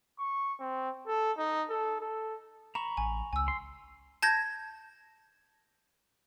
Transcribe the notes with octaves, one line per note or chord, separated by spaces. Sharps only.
C#6
C4
A4
D#4
A4
A4
A#5 B5 C#6 E7
A1 G#5
C#2 G#5 E6
C6
A5 G6 G#6 A#6